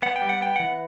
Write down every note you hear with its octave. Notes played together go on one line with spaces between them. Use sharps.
B3 F#5
G5
G3
F#5
B3 G5
E3 F#5